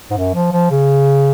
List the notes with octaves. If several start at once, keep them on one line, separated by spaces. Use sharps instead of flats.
G#2
F#2
F3
F3
C#3